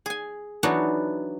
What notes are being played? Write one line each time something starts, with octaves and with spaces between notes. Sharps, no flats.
G#4 G#5
E3 F#3 B3 D4 D#4 F#4